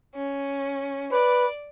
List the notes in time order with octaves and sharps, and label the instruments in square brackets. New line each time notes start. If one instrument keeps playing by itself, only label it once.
[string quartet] C#4
[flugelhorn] B4 [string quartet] D5